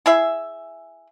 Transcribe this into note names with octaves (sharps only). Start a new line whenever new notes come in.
E4 G#4 E5